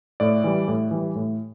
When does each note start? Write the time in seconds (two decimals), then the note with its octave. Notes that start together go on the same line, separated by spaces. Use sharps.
0.20 A2 D5
0.44 E3 G3
0.68 A2
0.91 E3 G3
1.15 A2